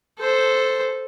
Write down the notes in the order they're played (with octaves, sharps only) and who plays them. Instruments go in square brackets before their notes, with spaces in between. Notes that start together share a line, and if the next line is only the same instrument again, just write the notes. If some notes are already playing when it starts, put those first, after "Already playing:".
[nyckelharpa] A4 C5